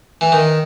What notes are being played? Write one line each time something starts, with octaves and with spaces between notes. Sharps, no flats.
E3
D#3